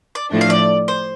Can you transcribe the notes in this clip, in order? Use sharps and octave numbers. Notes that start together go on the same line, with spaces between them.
D5
A2 F3 A3 D4
F5
D5
C5